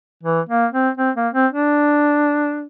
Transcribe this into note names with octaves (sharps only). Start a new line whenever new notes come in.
E3
A#3
C4
C4
A#3
C4
D4